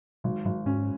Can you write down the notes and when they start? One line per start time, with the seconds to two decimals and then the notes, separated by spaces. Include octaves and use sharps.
0.24 G#1 B2
0.45 G#1 G#2
0.66 G#2 C#4